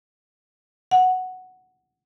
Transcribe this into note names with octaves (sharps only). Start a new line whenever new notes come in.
F#5